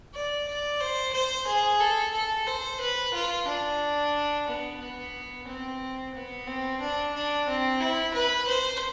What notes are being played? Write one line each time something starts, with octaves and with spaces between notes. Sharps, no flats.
D5
D5
C5
C5
G#4
A4
A4
C5
B4
F4
D4
B3
B3
C4
B3
C4
D4
D4
C4
E4
B4
C5